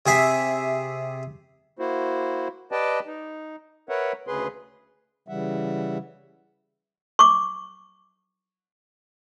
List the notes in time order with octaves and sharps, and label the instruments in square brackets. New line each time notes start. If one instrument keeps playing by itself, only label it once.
[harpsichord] C3 G#4 E5
[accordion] A#3 E4 F#4 C5
G4 B4 D5 D#5 G5 A5
D#4
A#4 B4 C#5 E5 F#5
D2 C#3 G#4 B4 C6
[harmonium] C#3 E3 G3 E5 F#5
[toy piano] C#6 D6